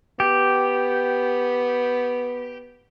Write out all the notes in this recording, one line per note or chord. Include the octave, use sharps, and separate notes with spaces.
B3 G4